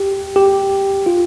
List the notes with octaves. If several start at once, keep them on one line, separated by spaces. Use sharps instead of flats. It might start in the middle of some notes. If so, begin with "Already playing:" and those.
Already playing: G4
G4
F4